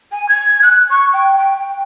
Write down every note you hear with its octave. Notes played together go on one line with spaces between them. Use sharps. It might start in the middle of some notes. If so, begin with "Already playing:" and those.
G#5
G#6
F#6
C#6
G5
G5